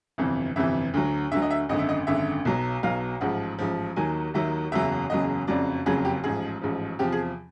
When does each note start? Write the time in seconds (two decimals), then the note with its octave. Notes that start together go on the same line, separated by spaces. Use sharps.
0.18 G1 F2 C3 E3
0.56 G1 F2 C3 E3 E5
0.94 D2 D3 F#3
1.31 D2 D3 F#3 E5
1.42 D#5
1.51 E5
1.69 G#1 F#2 D3 D#5
1.79 E5
1.89 D#5
2.07 G#1 F#2 D3 E5
2.45 B1 B2 F#3
2.83 B1 B2 F#3 F5
3.21 A1 G#2 F3 F#5
3.59 A1 G#2 F3
3.96 D#2 D#3 F#3 G#5
4.34 D#2 D#3 F#3 E5
4.72 F#1 E2 C#3 F#3 E5
5.10 F#1 E2 C#3 F#3 D#5
5.47 F#1 F2 C#3 F#3 D5
5.86 F#1 F2 C#3 F#3 G#4
6.05 G4
6.24 A1 G#2 F3 G#4
6.61 A1 G#2 F3
6.99 E2 C3 F3 G4
7.12 G#4